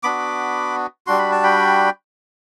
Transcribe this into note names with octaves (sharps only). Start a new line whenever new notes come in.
B3 D4 F#4 B5 D6
G3 D4 F#4 C6
B5
A5
G5 B5